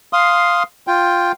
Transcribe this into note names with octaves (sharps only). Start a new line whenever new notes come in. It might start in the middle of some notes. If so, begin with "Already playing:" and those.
F5 C6 D#6
F4 G5